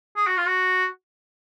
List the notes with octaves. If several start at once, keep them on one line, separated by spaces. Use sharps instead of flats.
G#4
F#4
F4
F#4